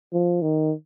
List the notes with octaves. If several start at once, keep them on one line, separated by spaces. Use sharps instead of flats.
F3
D#3